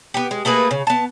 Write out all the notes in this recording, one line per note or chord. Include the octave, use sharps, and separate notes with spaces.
B3 G4
G#3
A3 A#3 G#4 B4
C#3
B3 A5